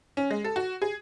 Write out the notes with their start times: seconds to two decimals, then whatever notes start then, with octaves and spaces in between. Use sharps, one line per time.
0.17 C#4
0.31 G#3
0.44 A4
0.56 F#4
0.82 G#4